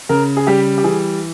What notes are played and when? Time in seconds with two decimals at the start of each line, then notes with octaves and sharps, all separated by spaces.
0.09 C#3 A#4
0.37 G#4
0.47 G3 G4
0.78 G4
0.84 E3 G#4